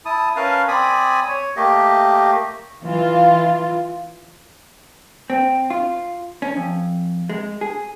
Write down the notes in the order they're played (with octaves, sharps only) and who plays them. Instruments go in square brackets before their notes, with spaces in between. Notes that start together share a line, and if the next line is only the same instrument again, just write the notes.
[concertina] E4 A5 D#6
C#4 A#4 B4 F5 A5
C4 D5 G#5 B5 D#6
C#5
A3 A#3 G4 D#5
[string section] E3 F4
[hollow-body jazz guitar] C4
F4
C#4
F2
G#3
G#4